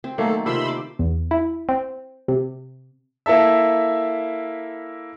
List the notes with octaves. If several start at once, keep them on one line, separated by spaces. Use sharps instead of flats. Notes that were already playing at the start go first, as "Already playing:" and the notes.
C4
D#3 F#3 A3 A#3 A4
C3 D#3 F4 F5 B5 C6 E6
C5 D6
E2
E4
C4
C3
A#3 E4 A4 E5